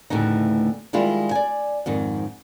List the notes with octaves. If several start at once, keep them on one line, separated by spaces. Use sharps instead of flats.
D2 A2 C#3 E3 D#4
D#3 G3 G#3 E4 F4
D5 G#5
F2 G#2 D#3